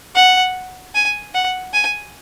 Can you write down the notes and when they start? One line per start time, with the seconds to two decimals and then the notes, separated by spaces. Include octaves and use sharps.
0.16 F#5
0.95 G#5
1.34 F#5
1.74 G#5